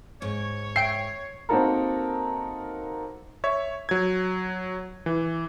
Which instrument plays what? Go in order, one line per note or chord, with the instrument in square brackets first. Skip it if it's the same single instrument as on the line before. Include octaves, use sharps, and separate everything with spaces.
[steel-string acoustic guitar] G#2 [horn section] C#5
[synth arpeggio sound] E5 G5 D7 [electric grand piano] C7
[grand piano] A#3 C4 D#4 F#4 A4 A#4
[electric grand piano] C#5 E5
F#3 G#6
E3